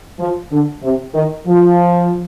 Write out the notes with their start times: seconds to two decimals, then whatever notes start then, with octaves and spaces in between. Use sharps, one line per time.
0.19 F3
0.51 D3
0.83 C3
1.14 D#3
1.47 F3